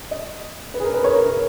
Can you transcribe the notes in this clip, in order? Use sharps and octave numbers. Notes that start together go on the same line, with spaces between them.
D#5
B4
G#4
A#4
B4
C#5
A#4
A#4